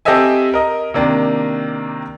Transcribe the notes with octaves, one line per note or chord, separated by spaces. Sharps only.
C4 G4 A4 D#5 E5 G#5
A#4 D#5
C3 D#3 A#3 D4